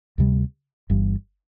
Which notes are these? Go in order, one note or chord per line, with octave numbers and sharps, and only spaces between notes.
D2 C3 G3
G1 G2 E3